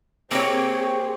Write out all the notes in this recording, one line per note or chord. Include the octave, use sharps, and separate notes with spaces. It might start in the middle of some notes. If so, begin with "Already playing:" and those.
A#3 C4 G4 G#4 C5 C#5